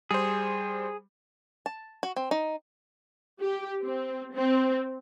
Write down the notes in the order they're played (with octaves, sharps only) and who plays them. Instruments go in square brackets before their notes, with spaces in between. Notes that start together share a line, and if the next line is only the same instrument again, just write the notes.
[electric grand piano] G3 C5 [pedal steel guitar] G#4
[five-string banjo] A5
F#4
C4
D#4
[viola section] G4
C4
C4